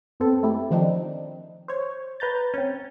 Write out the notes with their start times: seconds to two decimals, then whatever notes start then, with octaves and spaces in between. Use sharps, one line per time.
0.20 F#2 B3 C4 A4
0.43 A3 E4 G4
0.70 D#3 F3 C4 D4 D#4
1.68 C5 C#5
2.20 B4 A#5 G6 A6
2.54 C4 C#4